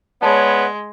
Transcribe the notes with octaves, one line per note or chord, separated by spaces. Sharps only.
G#3 B3 C#5 D5 A5 B5